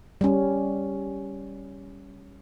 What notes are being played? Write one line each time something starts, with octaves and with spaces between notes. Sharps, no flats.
G3 C#4